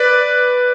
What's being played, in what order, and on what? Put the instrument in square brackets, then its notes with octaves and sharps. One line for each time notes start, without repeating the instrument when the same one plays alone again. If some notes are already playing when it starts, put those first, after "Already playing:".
Already playing: [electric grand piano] B4 D5